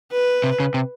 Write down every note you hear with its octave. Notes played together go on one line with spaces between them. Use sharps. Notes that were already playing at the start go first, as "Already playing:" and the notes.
B4
C3
C#3
C3